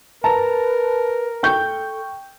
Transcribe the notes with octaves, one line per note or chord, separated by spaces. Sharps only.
A#4 B4 A5 A#5
A4 G5 C#6 G6